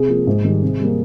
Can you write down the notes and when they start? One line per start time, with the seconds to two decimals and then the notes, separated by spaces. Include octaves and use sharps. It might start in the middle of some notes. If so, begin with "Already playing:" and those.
Already playing: C3 G#4
0.08 F3 A#3
0.27 G#2
0.45 D#3 G3
0.62 C3
0.80 G3 A#3